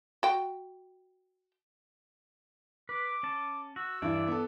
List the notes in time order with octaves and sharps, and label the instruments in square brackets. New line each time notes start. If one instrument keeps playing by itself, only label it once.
[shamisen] F#4 G5
[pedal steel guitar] B4 [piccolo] D6
[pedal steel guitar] C#4 A5
[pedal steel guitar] F#4 [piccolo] E6
[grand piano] G2 E3 E4 [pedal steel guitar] D5
[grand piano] B3 A4